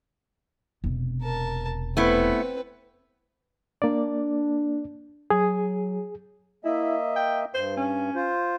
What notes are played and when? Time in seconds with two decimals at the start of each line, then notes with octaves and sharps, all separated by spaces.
0.84 E1 C3
1.22 A#4 A5
1.97 A3 B3 C4 E4 B4
3.82 A#3 D4 D5
5.30 F#3 G#4
6.65 A#3 E4 D#5 E5
7.16 G5
7.54 G2 C5
7.77 C#4
8.15 F4 C5